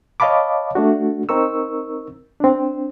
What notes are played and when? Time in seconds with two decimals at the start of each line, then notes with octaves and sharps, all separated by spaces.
0.20 C#5 D#5 F5 A5 B5 D6
0.75 A3 D4 F#4
1.29 C4 D#4 A#4 C#6 E6
2.40 C4 D4